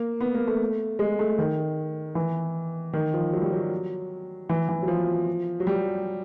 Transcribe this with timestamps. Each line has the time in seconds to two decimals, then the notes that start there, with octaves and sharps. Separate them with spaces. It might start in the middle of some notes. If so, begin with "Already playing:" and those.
Already playing: A#3
0.21 B3
0.35 A#3
0.47 A3
0.99 G#3
1.19 A3
1.39 D#3
2.15 E3
2.93 D#3
3.14 F3
3.33 F#3
3.42 G3
3.52 F#3
4.49 E3
4.69 E3
4.82 F#3
4.88 F3
5.60 F#3
5.67 G3